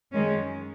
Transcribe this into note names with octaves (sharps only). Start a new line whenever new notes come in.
F#2 D#3 G#3 C#4